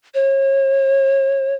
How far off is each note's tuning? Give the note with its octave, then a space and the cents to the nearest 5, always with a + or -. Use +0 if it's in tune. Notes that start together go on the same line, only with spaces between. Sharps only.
C#5 -35